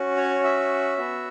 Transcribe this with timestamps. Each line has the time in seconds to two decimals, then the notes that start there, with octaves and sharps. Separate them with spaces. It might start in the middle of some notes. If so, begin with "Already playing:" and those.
Already playing: C#4 F#4
0.17 C#5
0.44 E5
0.98 B3 F#4